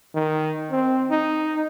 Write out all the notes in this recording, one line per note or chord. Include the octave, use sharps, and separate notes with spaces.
D#3
C4
D#4